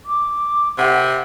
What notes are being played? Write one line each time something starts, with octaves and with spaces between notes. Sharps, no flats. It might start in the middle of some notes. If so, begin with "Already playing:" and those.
D6
C3 F#5